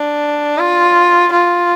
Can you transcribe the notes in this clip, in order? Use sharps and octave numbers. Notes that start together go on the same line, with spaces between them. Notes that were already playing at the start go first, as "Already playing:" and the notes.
Already playing: D4
F4
F4